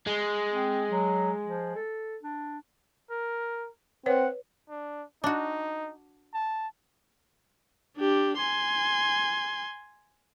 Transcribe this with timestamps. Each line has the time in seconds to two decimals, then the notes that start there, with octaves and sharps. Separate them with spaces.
0.07 G#3
0.52 C4
0.90 F#3
1.45 F3
1.75 A4
2.23 D4
3.10 A#4
4.06 C4 B4 C#5 F#5
4.70 D4
5.24 D4 D#4 F#4
6.34 A5
7.97 D4 G4
8.38 G#5 C6